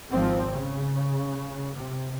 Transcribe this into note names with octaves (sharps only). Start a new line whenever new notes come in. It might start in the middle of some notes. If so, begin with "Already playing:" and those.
G#1 F3 C4
C#3
C3